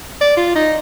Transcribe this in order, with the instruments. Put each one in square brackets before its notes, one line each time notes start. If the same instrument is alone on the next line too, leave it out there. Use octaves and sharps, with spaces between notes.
[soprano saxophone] D5
F4
D#4